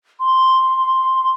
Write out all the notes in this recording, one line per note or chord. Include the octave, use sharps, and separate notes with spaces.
C6